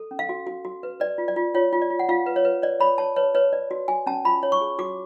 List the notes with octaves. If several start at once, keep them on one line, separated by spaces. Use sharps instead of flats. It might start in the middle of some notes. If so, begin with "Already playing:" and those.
Already playing: A4
C#4
F5
F#4
F#4
F#4
B4
B4 D5
F4
D5
F4
F4 C#5
F4
D5
F4
F#5
F4 F5
B4
C#5
B4
C#5 D5
C#5 B5
C#5 A5
B4 C#5
B4 C#5
B4 D5
F#4
F#4 G#5
C#4 A5
F4 B5
C#5
C#6
G#4
F#4 D6